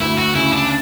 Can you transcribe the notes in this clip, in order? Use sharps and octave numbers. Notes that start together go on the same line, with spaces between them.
D2 E4
F#4
C#3 E4
D4